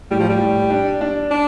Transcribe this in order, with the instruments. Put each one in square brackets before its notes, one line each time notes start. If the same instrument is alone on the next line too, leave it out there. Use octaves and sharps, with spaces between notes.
[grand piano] A2 [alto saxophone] G3
[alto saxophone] F3
G3
[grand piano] A2
D4
D4
[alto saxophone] D4